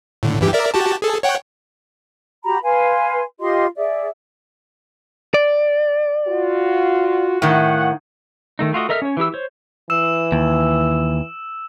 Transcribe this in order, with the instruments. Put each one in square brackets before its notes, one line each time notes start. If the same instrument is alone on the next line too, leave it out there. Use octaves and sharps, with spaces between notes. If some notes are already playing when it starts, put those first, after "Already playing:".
[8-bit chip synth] A2 D3
G2 E3 G4
A#4 D5 E5
F#4 G4 A5
G#4 A4
C#5 F#5 G5
[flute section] F#4 G4 A#5 B5
B4 F5 G#5 C6
F4 G4 D#5 C6
G#4 D5 E5
[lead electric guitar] D5
[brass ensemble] F4 F#4
[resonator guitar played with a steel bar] A2 D#3 [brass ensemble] F5 F#5
[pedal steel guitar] D#3 A3 D#4
A3 F4 F#4 D#5
A4 A#4 D#5 E5 F6
C#4 C#5
E3 E4 G4 E6
C5 C#5
[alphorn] E3 [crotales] E6 E7
[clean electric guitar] D#2